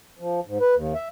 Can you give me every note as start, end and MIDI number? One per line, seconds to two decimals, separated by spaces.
0.19 0.40 53
0.46 0.58 44
0.61 0.75 71
0.75 0.93 39
0.95 1.08 76